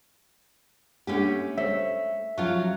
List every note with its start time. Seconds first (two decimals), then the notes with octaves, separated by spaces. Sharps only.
1.07 A3 A#3 C#4 D4 G4 F#5
1.58 A3 C5 C#5 E5
2.38 F3 F#3 C#4 F4